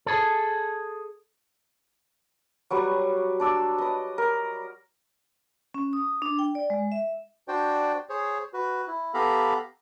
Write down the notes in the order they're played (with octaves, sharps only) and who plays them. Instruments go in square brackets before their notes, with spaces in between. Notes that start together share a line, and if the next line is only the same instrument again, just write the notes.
[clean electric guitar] G#4 A4
[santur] F#3 G3 B4 C#6
D4 D5 E6
B4 D#5
A#4
[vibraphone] C#4
D#6
D4
G5
D5
G#3
E5
[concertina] D4 F#4 C5 D5 G5
G#4 C5 C#5
F#4 B4
E4
B3 G4 A4 F5 A#5 B5